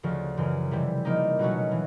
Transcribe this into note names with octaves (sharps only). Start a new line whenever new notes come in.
D2 C#3 F3
F#2 C#3 E3
C3 E3 G3
F3 A#3 D#4
B2 F#3 A3 C#4 F#4
E3